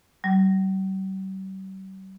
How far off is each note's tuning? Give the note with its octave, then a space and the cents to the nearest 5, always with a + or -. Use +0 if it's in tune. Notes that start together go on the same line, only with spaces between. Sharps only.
G3 -45